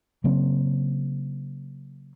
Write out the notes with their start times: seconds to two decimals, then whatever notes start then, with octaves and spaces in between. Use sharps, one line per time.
0.24 C#3 F#3 A#3 C4